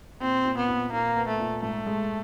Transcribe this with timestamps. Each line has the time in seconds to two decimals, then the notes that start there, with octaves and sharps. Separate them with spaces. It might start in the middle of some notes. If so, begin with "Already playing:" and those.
0.21 A#2 C4
0.45 A#2
0.58 B3
0.68 A#2
0.92 A#2 A#3
1.16 B3
1.28 A3
1.40 A#2
1.63 G#2 A3
1.87 G#3